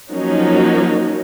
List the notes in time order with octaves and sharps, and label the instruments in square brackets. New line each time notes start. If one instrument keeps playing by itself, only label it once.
[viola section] F3 F#3 A#3 C#4 D#4 F#4